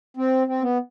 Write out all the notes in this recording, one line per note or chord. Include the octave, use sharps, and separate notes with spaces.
C4
C4
B3